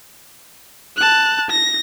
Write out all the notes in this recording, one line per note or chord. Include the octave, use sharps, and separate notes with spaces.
A5 F#6
A#6